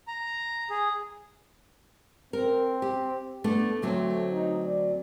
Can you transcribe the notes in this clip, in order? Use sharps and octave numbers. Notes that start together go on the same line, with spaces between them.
A#5
G#4
C4 A#4
G4
A3 B3 D4
D2 F#3 A3 C4
D#4
D5